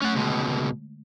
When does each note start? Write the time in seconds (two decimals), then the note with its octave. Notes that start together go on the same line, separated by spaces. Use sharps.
0.02 A3 C#4 F#5 A6
0.15 C#2 B2 D3 G#3 C6